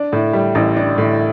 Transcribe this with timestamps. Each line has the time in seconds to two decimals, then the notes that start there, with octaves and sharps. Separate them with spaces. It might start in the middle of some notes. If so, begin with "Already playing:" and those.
Already playing: D4
0.13 A2
0.33 G3
0.55 A1
0.76 D4
0.98 A2